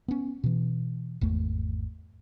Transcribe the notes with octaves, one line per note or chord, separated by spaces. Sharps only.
B3 C#4
B2 E3
G#1 E2 A3